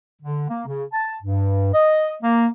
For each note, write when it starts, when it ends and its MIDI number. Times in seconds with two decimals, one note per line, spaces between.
0.21 0.46 50
0.49 0.62 58
0.66 0.84 49
0.93 1.16 81
1.22 1.71 43
1.74 2.14 75
2.23 2.47 58